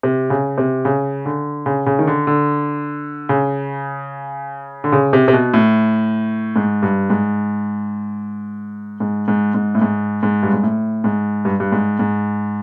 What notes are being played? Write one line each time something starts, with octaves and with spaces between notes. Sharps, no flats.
C3
C#3
C3
C#3
D3
C#3
C#3
D#3
D3
D3
C#3
D3
C#3
C3
C3
B2
A2
G#2
G2
G#2
G#2
G#2
G#2
A2
G#2
G#2
G2
G#2
A2
G#2
G2
G2
G#2
G#2